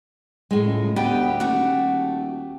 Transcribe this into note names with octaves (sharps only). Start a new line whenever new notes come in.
A2 G#3
C#2
D2 B3 G4 D#5 G5
D#1 A3 F#4